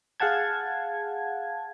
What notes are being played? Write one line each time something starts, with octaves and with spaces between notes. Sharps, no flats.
G#4 F5 F#5 A5 G#6